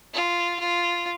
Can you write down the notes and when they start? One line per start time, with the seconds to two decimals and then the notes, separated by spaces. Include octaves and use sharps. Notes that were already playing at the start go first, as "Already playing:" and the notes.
0.14 F4
0.60 F4